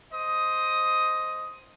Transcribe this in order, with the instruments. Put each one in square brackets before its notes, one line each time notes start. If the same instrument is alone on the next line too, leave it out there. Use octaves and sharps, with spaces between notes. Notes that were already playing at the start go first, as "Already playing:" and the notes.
[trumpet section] C5 D#5 D#6